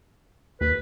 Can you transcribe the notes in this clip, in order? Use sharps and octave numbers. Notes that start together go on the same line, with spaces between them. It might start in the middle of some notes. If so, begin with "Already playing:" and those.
D#2 B4